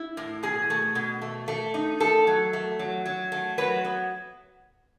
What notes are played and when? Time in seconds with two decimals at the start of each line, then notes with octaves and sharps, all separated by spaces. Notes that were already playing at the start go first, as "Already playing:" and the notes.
Already playing: E4
0.17 A2
0.43 B2 G#4
0.70 A3
0.95 B2
1.22 A3
1.48 A3
1.74 D#4
2.00 A3 A4
2.27 F#3
2.53 A3
2.79 F#3
3.06 F#3
3.32 A3
3.58 F#3 B4
3.85 B3